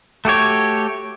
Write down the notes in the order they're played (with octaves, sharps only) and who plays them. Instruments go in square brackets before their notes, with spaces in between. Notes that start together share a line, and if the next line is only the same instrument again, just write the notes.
[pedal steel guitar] A3 F#4 G4 C#5